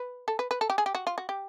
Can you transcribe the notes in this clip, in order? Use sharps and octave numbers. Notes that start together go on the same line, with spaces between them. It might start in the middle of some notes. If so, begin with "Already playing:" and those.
Already playing: B4
A4
B4
B4
A4
G4
G#4
G4
F#4
F4
F#4
G4